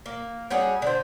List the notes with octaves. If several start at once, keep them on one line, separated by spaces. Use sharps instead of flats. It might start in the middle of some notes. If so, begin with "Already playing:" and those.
A#3
G3 C#4 F#4 G#4
D3 C5